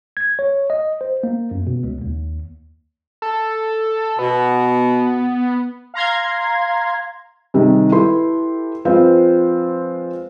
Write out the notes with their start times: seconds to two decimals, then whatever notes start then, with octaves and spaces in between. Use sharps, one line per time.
0.17 G#6
0.39 C#5
0.70 D#5
1.01 C5
1.23 A#3
1.51 F#2
1.67 B2
1.83 C#2
2.01 D#2
3.22 A4
4.19 B2 B3
5.94 F5 A#5 C6 G#6
7.54 C3 D#3 G3 G#3
7.92 E4 G4 A4 B4 C6
8.85 F3 G#3 C4 F4 B4 C5